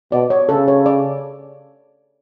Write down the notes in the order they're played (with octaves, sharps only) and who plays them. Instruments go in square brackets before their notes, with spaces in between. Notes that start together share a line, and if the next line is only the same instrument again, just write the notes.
[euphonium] B2 [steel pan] D5
[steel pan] C#5
[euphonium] C#3 [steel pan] A4
[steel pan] C#5
D5